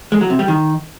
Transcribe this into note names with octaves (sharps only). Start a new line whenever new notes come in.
G#3
F#3
C3
G3
D#3